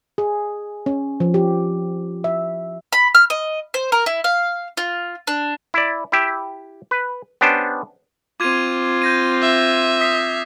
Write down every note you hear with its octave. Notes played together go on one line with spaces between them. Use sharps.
G#4
C#4
F3
G4
E5
B5
F6
D#5
C5
A#4
E4
F5
F4
D4
E4 D5
E4 G4 E5
B4
B3 C#4 D4 G4 C5
C4 F4 D6 G#6 D#7
G6 A#6 D#7
E5
D#6 B6 C7